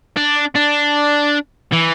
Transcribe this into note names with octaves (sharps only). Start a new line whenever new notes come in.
D4
D4
E3